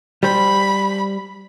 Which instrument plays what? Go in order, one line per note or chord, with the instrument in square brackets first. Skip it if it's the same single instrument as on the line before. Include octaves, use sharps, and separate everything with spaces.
[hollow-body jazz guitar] G3 C5 [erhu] B5